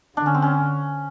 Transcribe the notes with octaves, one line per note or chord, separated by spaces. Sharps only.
D3 D4
C#4
C4
C#4